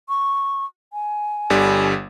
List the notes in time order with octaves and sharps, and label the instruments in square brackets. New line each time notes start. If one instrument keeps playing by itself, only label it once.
[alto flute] C#6
G#5
[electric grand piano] G1 D3 G3